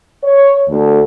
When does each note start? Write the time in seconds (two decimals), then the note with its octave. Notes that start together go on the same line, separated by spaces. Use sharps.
0.24 C#5
0.68 D2